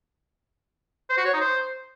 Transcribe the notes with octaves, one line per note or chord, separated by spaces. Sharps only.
C5
F#4
C#5
D#4
C5